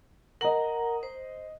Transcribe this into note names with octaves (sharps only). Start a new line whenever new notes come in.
A#4 D#5 F#5 A#5 F#7
C5